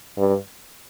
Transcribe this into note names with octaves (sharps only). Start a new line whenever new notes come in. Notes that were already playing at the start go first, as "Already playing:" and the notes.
G2